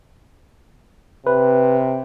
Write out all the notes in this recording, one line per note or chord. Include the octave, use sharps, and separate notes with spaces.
C3 B4